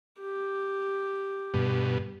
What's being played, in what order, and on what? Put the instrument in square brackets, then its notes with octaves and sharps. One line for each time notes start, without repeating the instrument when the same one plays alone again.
[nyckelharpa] G4
[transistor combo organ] G2 B2